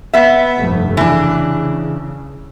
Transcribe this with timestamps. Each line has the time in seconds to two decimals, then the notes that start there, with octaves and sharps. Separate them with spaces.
0.13 B3 E5
0.58 F1 G2 A3
0.97 C#3 E3 D4